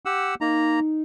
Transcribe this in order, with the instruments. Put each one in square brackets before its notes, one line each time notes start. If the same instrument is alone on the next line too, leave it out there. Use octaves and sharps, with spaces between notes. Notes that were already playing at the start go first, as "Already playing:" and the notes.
[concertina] G4 F#5 E6
[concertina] A#3 A#5 [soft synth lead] D#4